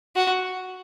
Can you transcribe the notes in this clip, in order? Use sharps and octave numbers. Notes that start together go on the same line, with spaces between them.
F#4